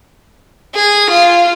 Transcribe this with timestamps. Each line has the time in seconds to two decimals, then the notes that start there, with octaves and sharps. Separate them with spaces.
0.75 G#4
1.10 F4